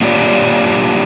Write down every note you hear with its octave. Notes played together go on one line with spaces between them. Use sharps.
A#3 D4 F4 G4 C#5 D5